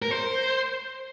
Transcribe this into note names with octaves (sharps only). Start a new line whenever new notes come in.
A#4
C5